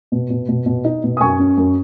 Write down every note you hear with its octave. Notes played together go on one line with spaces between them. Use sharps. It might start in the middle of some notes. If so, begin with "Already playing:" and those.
B2
B2
B2
B2
D#4
B2
D#6
F#2 G#5 C#6
C#4
F#2